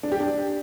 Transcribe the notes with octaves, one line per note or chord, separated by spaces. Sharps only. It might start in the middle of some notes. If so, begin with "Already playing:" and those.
D4
G4
D4